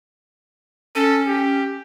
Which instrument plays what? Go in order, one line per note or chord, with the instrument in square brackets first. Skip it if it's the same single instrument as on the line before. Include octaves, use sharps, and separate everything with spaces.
[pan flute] C#4 [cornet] A4
[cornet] G4